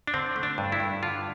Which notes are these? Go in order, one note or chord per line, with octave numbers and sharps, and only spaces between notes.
D4
D3 C4
A3
D4
G2
E4
G2
D3 F4